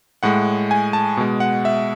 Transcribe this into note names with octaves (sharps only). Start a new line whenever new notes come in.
A2 G#3 F#5
G#5
A5
B2 G#3
F#5
E5